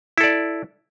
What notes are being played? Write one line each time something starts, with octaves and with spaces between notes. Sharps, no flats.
E4 A4 D5